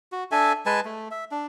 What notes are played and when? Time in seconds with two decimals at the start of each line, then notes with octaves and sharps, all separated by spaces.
0.12 F#4
0.31 D4 A4 E5 G#5
0.66 G#3 B4 G#5 A5
0.85 A3
1.11 E5
1.31 D4